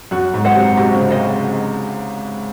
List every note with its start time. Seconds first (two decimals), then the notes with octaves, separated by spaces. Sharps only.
0.11 F#2 F#4
0.34 G#2
0.44 C5 D#5 F#5
0.55 C3
0.77 C3 F#4
0.94 C#3
1.10 C5 D#5